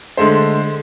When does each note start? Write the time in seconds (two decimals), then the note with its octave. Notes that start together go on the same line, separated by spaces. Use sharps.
0.17 D3 G#3 A3 C5